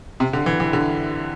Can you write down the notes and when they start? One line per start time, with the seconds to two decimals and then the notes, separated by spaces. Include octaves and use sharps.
0.20 C3
0.33 D3
0.46 E3
0.60 E3
0.73 D3